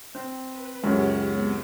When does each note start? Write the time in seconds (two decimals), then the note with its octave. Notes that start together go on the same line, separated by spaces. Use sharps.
0.15 C4
0.46 B4
0.83 C#2 F#2 C#3 G4 C#5 F#5
1.28 G#3 B3 C4